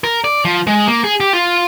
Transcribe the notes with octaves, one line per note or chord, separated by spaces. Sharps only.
A#4
D5
F3
G#3
A#3
G#4
G4
F4